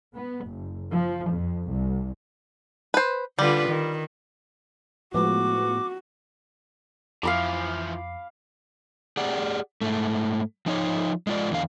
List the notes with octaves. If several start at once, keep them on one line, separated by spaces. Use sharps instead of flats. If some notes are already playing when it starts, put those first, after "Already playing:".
B3
F#1
F3
F2
C2
B4 C5
D3 G3 F4 B4
D#3
A2 F3 G#3 B3 F#4 D6
F2 E3 F3 F5 B5 D6
G4 G#4 D5 F#5
G#2 A3
F3 D#4 C#5
G#3 F4 D5
E2 D3 F5